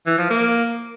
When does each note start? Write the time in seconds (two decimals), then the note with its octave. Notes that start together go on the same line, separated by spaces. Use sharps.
0.07 E3
0.18 F3
0.30 A#3